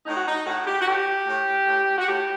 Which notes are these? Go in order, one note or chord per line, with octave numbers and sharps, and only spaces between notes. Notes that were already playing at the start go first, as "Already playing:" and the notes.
A2 D#4
F#4
D#4
A2 F#4
G4
F#4
A2 G4
A2
A2
F#4
A2 G4